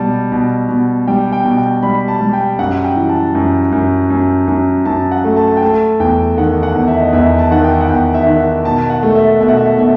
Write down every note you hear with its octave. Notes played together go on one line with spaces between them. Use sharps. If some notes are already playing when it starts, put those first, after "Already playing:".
Already playing: B2 G3 A5
B2
B2
G3 G5
G5
B2
G5
G3 B5
A5
G3
G5
F#2 F#5
G5
E3
A5
F#2
F#2
F#2
F#2
F#2 A5
F#5
A3
A5
G5
A3 A5
E2 G5
D#3 F#5
F#5
E2
E5
D#5
E2 E5
A5
D#3 F#5
G5
F#5
E2 G5
E5
D#3
F#5
B2 A5
F#5
A3
E5
B2 E5
F#5
E5
B2 E5